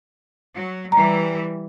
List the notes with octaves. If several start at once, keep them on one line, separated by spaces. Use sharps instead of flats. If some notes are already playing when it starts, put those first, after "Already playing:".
F#3
E3 G3 A#5